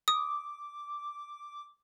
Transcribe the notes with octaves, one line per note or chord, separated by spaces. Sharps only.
D6 D#6